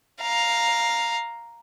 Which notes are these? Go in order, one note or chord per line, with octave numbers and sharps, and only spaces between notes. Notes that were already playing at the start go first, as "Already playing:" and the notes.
F5 A#5